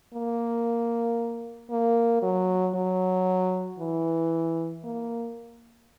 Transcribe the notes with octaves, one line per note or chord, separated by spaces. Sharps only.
A#3
A#3
F#3
F#3
E3
A#3